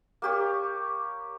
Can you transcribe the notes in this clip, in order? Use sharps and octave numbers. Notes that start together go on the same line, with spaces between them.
A#3 G4 C#5